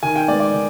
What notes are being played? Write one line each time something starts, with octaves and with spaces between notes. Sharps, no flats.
D#3 G#5
G5
G#3 B3 D5
D5
D#3